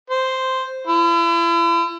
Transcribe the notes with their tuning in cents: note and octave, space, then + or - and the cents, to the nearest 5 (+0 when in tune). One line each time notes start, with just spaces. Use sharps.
C5 -5
E4 +40